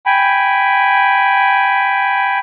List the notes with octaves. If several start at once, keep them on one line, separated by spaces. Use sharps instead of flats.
G5 G#5 B5